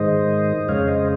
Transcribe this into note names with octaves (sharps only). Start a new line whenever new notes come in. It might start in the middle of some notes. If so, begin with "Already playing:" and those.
Already playing: G#2 D#3 G#3 C5 D#5
F2 C#3 G#3 C#5 F5
C5 D#5